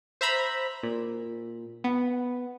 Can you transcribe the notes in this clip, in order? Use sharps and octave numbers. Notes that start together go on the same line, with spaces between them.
C5 E5 A#5 B5
A#2
B3